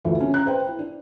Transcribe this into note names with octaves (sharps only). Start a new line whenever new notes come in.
D2 E3 F4
C#3 C#4
A#5 F#6
B4 C5 G5
E4
D4